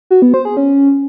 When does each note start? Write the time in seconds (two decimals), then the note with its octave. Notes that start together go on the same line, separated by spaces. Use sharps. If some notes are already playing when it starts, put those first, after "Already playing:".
0.11 F#4
0.22 B3
0.34 C5
0.45 G#4
0.57 C#4